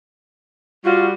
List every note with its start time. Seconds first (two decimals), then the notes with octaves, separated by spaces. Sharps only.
0.84 G3 F4 F#4